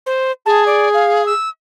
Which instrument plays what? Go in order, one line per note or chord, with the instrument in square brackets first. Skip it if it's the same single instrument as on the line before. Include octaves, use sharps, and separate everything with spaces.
[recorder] C5
[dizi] G#4 [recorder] A5
[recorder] D5
F5
E6